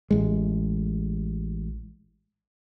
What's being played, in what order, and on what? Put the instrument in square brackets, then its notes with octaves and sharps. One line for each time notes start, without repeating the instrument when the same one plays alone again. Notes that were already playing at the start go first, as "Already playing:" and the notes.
[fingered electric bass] A1 G#3